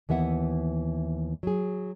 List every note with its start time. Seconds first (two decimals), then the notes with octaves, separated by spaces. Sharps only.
0.09 D#2 E3 B3 E5 F#5
1.43 F#3 G#4